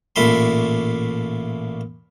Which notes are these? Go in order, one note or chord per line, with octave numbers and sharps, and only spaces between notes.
A1 A#2 A3 B5 C6